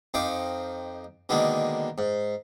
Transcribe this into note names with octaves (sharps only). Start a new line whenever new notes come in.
F2 D#4 C5 F5 G5 D6
B2 D3 D#3 G#3 A#3
G#2